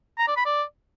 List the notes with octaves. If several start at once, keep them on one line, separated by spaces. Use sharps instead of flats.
A#5
D5
B5
D5